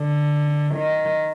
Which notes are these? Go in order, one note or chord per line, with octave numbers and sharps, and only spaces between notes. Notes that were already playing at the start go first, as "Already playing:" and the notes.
Already playing: D3
D#3